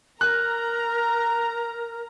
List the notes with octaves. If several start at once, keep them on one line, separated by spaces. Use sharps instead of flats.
A#4 A#5 F#6